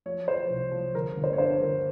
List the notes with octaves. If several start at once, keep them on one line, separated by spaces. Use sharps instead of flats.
F3 C#5
F3 C5
C2
F3
G1 A#4
G1
C5
C#5
G2 C5
G1 A#4